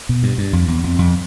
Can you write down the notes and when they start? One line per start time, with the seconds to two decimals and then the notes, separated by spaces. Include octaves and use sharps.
0.09 B2
0.23 G2
0.38 G2
0.53 F2
0.68 E2
0.84 F2
0.99 F2